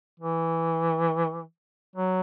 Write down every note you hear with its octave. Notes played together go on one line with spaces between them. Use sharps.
E3
F#3